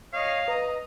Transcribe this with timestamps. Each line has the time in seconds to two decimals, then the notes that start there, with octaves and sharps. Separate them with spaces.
0.13 C#5 D#5 F5
0.48 B4 D#5 A#5